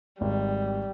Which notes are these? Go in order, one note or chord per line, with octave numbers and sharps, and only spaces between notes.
G#1 G3